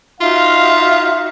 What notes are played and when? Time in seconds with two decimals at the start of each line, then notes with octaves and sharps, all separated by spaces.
0.21 D#4 F4 F#4 E5 F5